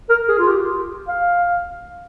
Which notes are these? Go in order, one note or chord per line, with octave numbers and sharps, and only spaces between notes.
A#4
G#4
F4
G4
F5